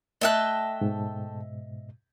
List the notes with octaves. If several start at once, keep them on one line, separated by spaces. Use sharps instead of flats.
A3 D#5 E5 G5 A5 F#6
G#2 B2